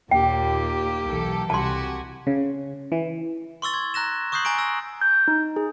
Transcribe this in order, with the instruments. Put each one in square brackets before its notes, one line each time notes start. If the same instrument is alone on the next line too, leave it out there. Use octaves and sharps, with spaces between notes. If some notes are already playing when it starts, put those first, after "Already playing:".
[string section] D#2 A#2 [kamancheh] A#3 G4 [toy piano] G5
[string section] B1 E3 A4
[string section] C2 F#4 [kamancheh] G4 G#5 [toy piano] A5 C6
[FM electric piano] C#3
E3
[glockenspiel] C6 C#6 E6 A6
G#6
A#5 F#6 A#6 E7
C#6 D#6 F#6 G6 C7 F#7
G#5 A#5 C#6 D7
E6 A#6
[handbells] G6
D#4
G#4